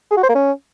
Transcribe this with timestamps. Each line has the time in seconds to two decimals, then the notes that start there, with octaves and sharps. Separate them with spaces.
0.11 G#4
0.17 F#4
0.23 C5
0.29 A#3
0.35 C#4